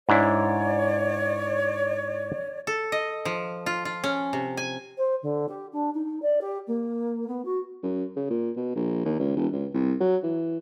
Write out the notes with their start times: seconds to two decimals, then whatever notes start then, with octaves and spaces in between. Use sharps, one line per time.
0.09 G#2 D4 E4 C#5 D5
2.67 A4
2.92 D#5
3.25 F3
3.66 F4
3.85 F4
4.04 C#4
4.33 C3
4.57 G#5
4.98 C5
5.22 D3
5.49 G4
5.73 D4
5.94 D#4
6.22 D5
6.41 G4
6.67 A#3
7.28 B3
7.45 F#4
7.83 F#2
8.16 C#3
8.30 A#2
8.57 B2
8.75 A#1
9.05 D#2
9.20 C#2
9.36 E1
9.53 C#2
9.74 C2
10.00 F#3
10.23 E3